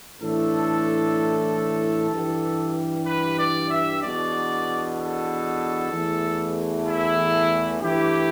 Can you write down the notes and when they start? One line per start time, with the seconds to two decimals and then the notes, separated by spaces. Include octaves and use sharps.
0.22 A2 E3 A3 D4 A4
2.12 G2 E3 G3
3.07 B4
3.38 D5
3.70 E5
4.01 E2 B2 B3 D4 D5
4.97 A4
5.92 E2 E3 A3
6.87 E4
7.81 G2 E3 A3 E4 G4